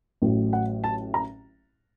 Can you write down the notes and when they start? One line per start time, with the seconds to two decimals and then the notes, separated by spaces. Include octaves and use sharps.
0.22 A1 A2 F#3
0.53 F#5
0.84 A5
1.14 A#5